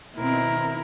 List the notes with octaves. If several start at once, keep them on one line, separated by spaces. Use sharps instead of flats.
B2 D#3 C4 E4 A#4